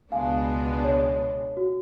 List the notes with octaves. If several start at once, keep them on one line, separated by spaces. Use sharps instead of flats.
C#2 B2 G#3 B3 D4 F5 G#5
C#5
F#4